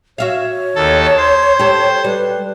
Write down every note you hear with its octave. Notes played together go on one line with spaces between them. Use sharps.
F#4 C#5 E5 F5
D#2 A4 A5
C5 C6
G4 A4
G3 B4